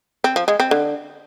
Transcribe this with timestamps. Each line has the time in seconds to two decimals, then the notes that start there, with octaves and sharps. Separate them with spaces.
0.24 C4
0.36 F3
0.48 G#3
0.60 C4
0.71 D3